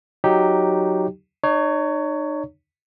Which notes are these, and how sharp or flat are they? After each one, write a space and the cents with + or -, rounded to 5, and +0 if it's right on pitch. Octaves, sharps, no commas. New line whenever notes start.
F#3 +0 D#4 +0 G4 +0
D#4 -40 C#5 +15